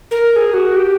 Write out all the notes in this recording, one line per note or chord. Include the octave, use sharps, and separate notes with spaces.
A#4
A#4
G#4
F#4
G4